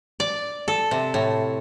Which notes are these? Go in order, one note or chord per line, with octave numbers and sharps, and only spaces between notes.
D5
A4
C3
A2